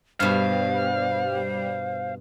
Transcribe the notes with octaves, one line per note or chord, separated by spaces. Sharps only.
G2 B2 G3 C5 F5